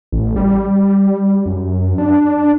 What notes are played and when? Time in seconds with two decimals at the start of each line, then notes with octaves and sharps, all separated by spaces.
0.12 A1
0.36 G3
1.46 F#2
1.98 D4